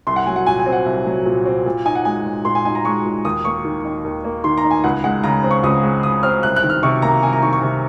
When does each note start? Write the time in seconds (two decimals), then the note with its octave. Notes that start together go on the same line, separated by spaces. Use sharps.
0.07 C2 C6
0.16 F#5
0.26 F#3 G#5
0.36 F#5
0.46 A#2 G#5
0.60 G#5
0.66 C4
0.73 F#5
0.86 C2
1.06 F#3
1.26 A#2
1.46 C4
1.66 A#2
1.85 D#4 G#5
1.95 F#5
2.05 G#3 G#5
2.25 A#2
2.45 A#2 C6
2.55 G#5
2.65 D#4 G#5
2.75 A#5
2.85 G#3 C#6
3.05 A#2
3.25 D#2 D#6
3.45 A#3 C#6
3.65 D#3
3.84 D#4
4.05 D#2
4.24 A#3
4.44 D#3 C6
4.58 A#5
4.64 D#4
4.71 G#5
4.84 C#2 F#5
5.04 G#3 F#5
5.24 C#3 A#5
5.44 C4
5.51 C#6
5.63 C#2 D#6
5.83 G#3
6.03 C#3 D#6
6.23 C4 F6
6.43 C2 F#6
6.56 F#6
6.63 D#3
6.70 F6
6.83 C3 C#6
7.02 A#3 A#5
7.23 C2 G#5
7.33 A#5
7.42 D#3 C#6
7.53 C#6
7.62 C3